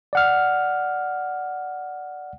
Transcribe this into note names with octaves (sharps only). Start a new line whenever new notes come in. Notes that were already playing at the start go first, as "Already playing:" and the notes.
D5 F#5 F6